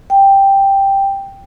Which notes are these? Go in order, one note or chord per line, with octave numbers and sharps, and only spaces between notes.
G5